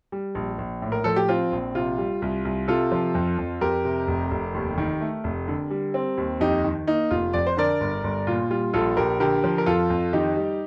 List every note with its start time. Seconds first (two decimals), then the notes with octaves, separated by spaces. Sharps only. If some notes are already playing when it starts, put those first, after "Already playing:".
0.12 G3
0.35 A#1
0.58 A#1
0.82 A2
0.92 A#4
1.04 F3 A4
1.16 G4
1.29 C4 F4
1.52 A#1
1.75 C3 F4
1.98 G3
2.22 C2
2.45 C2
2.68 C3 F4 A4
2.92 F3
3.15 F2
3.38 F2
3.61 F2 G4 A#4
3.85 C3
4.08 F1
4.31 F1
4.54 D#2
4.78 D#3
5.01 A3
5.24 F1
5.48 D3
5.71 G3
5.94 C4
6.17 D#2
6.40 F2 D#4 G4
6.64 D#3
6.87 A#3 D#4
7.11 F1 F4
7.33 F2 D5
7.47 C5
7.57 D3 A#4 D5
7.81 G1
8.04 G1
8.27 A#2 F4
8.50 G3 F4
8.73 A#1 F4 A4
8.97 A#1 G4 A#4
9.20 D3 G4 A#4
9.44 F3
9.58 A#4
9.66 F2 F4 A4
9.90 F2
10.13 D#3 D#4 G4
10.36 G3